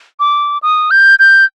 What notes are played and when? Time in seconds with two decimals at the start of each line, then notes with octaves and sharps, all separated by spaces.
0.20 D6
0.63 D#6
0.91 G6
1.19 G6